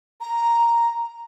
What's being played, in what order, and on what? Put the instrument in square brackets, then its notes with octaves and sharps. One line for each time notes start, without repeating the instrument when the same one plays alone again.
[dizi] A#5